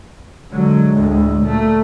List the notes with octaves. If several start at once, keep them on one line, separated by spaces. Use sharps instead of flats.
D3 F#3 G#3
D2 A2 D3
A#2 A3